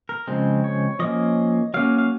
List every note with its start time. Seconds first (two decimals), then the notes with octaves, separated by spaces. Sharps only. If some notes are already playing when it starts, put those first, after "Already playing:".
0.09 A#4
0.27 C#3 F3 G#3 C4
0.64 C#5
0.99 F3 A#3 C#4 D#5
1.74 F#3 A#3 C#4 F5
1.98 F5